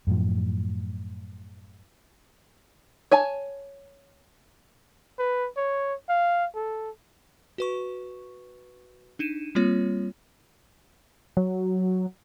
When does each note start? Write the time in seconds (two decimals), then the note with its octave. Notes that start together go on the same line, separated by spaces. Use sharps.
0.07 F#2 A2 F3
3.11 C#5 G#5 A5
5.19 B4
5.57 C#5
6.09 F5
6.55 A4
7.58 F#4 B4 C#6
9.19 D4 D#4 D#7 E7
9.55 G3 A#3 C4 F4 C#5
11.37 F#3